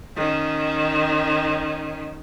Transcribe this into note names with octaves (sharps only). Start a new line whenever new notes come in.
D#3 C#4